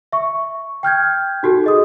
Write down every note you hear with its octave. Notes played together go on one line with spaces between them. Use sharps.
E5 C#6
G5 F6 G6 G#6
D#4 F#4 G4 A4
G#4 D#5 D#6